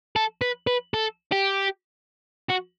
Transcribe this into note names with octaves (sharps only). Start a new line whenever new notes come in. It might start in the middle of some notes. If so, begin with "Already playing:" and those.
A4
B4
B4
A4
G4
F#4